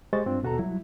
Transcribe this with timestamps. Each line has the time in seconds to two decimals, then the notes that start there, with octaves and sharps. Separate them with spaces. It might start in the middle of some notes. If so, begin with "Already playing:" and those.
0.13 G#3 G4 C5 D#5 C#6 A6
0.26 G2 C4 D4 F4
0.42 D#2 B2 F#4 A4 A#5
0.59 F#3 G3 E4